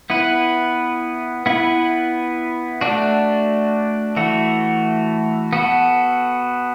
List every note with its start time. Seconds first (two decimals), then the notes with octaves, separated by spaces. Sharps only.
0.10 B3 E4 B4
1.46 B3 E4 B4
2.81 A3 D4 F#4
4.17 E3 A3 F#4
5.53 B3 F#4 A4